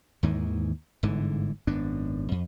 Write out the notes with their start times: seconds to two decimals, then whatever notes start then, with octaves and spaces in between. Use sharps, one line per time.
0.23 D#2 G#2 D#3 E3
1.03 G1 G#2 D3 E3
1.67 G#1 F#2 B3 D4
2.32 F2